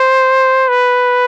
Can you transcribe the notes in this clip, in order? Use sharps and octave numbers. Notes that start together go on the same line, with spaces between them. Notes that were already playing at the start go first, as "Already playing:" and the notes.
Already playing: C5
B4